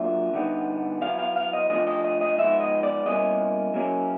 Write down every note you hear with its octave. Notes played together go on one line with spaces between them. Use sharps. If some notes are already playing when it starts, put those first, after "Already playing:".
Already playing: F#3 A#3 D4 F4 E5
D3 G3 B3 D#4
F#3 B3 E4 F5
F5
F5
D#5
F3 A3 D4 F4 D#5
D#5
D#5
D#5
F3 G#3 B3 D#4 E5
D#5
D5
B2 G3 A#3 C#4 E4 D#5
F#3 A#3 C#4 E4